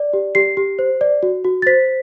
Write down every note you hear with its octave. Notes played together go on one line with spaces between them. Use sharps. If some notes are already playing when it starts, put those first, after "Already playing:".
Already playing: D5
G4
G4 C7
G4
C5
D5
F#4
F#4
A6
C5 B6